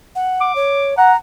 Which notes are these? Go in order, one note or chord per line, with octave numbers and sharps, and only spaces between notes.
F#5
D6
C#5
F#5 A#5